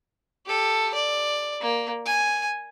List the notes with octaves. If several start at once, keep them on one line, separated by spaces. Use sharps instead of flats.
G4 A4
D5
A#3
G#5